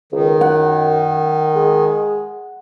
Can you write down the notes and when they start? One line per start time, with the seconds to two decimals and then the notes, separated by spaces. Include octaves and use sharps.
0.12 C#2 D#3
0.41 F#2 F#5
1.56 G#3